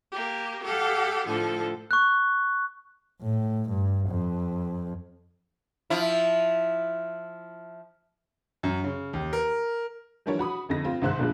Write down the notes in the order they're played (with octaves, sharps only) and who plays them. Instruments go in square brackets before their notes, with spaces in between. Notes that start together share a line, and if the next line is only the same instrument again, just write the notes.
[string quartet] A#3 G4
G4 A4 F5 F#5
A2 D3 F3 A4
[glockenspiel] C#6 F#6
[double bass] A2
G2
F2
[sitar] F3 E4
[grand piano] F#2
C#3
D#2
A#4
[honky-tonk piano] E3 F3 G3 D4 A#4 C#5
F#4 B5 D#6
G1 F2 D#4 A#6
C4 F4
C2 G#2 D#3 C5 E5 F#6
B1 G2 A#2 F3 G#3